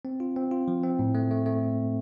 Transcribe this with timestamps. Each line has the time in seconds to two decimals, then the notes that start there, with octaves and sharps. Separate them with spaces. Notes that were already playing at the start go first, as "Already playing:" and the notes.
0.05 C4
0.20 F4
0.36 C4
0.51 F4
0.68 F3
0.83 C4
0.99 A2
1.15 A3
1.31 A3
1.46 A3